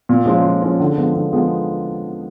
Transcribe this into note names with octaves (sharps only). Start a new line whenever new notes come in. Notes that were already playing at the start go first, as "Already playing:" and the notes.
A#2
F3 G#3 C#4
A#2
F3 G#3 C#4
D3
F3 G#3 B3
D3
F3 G#3 B3